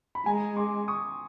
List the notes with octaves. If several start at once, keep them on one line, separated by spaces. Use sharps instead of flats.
B5
G#3 G#5 A#5
C6 D6
C#6 D#6